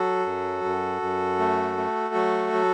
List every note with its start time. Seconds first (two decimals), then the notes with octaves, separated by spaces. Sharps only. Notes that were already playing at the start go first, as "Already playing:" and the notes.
Already playing: F#3 F#4 A4
0.26 F#2
0.64 F#2
1.02 F#2
1.39 A3
1.77 A3
2.15 F#3
2.53 F#3